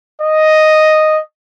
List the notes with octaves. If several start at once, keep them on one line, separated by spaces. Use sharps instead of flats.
D#5